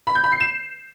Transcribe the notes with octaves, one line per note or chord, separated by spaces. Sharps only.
B5
G6
B5
C7
E7